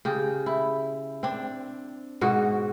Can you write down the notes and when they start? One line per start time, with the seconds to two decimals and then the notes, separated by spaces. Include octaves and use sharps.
0.05 C#3 G4
0.46 E4
1.23 C4 D4
2.21 G#2 B2 F#4